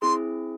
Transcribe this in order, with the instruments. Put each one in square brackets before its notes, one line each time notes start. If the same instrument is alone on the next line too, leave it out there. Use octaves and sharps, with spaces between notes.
[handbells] C4 E4 G#4 [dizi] C6